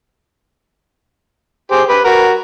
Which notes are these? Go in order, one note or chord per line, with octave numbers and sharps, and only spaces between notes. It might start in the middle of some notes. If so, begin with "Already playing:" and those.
G4 G#4 C5
G4 B4
F#4 A#4